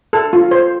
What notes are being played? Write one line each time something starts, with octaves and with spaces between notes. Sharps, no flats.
A4
F4
C5